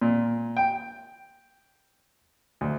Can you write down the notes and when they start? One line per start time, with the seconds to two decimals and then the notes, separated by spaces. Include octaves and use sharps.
0.02 A#2
0.57 G5
2.61 D2